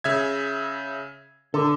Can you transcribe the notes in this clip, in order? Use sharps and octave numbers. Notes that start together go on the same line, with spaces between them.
C#3 E5 G#6
D3 A4